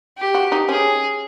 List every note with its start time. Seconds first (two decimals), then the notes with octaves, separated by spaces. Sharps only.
0.18 G4
0.35 F#4
0.52 D#4
0.69 C#4 G#4